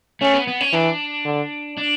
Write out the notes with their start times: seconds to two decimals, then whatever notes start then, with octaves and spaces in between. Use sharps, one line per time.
0.21 A3 C#4
0.34 B3
0.47 B3
0.61 C#4
0.73 E3 D4
1.25 D3
1.77 D4